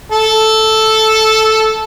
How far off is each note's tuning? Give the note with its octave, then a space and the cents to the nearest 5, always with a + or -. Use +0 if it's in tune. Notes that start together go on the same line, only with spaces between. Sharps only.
A4 -5